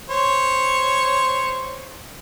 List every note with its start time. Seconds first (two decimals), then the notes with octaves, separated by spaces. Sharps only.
0.10 C5 C#5